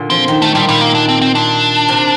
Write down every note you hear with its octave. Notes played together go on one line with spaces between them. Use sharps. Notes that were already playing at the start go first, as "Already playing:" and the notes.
Already playing: A#2 D3
F3 C4
D#3
D#3 A3
A#2 G3
A#2 G3
A#3
D4
C4
C4
A#2 D4
C3